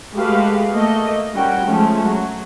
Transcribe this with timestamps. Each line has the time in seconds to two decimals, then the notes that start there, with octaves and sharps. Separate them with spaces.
0.14 G#3 A3 F#4 G4 B4 F5
0.72 A3 A#3 D#5
1.34 G3 C#4 F#4 A#4 G5
1.65 F3 G#3 A3 C#4
2.02 F#3